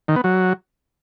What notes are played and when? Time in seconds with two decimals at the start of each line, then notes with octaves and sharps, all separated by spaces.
0.08 D#3
0.16 B3
0.24 F#3